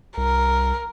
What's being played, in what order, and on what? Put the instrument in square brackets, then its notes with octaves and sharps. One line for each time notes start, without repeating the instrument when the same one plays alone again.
[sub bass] C2 [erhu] A#4